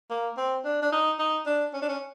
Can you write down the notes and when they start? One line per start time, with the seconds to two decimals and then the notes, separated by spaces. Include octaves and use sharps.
0.10 A#3
0.37 C4
0.65 D4
0.82 D4
0.92 D#4
1.19 D#4
1.46 D4
1.73 C#4
1.82 D4
1.88 C#4